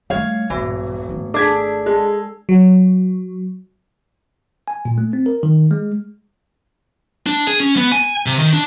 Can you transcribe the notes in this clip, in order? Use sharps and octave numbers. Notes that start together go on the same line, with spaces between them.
G3 A3 C#5 F5
E1 A#1 G2 E3
G#1 A3
D4 G#4 A4 D6 G#6 B6
G#3 A4
F#3
G#5
A#2
A3
C4
A#4
D#3
G#3
D4
G#4
C#4
B3
G#5
C3
D#3
D4